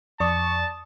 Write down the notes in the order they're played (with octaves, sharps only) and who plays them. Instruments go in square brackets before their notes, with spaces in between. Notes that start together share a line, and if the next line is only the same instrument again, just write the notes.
[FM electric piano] F2 D5 C#6 [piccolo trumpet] A5 [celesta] D#6